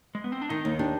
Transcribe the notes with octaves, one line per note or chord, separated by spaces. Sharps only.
G#3
B3
C4
D4
D#3 D#4
D#2
D4 G4